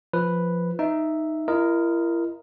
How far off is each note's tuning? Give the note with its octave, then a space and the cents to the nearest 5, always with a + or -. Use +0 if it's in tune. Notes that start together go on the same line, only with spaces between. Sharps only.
F3 +0 B4 +0
D#4 +0 E5 +0
E4 +40 A#4 +0 D#5 +0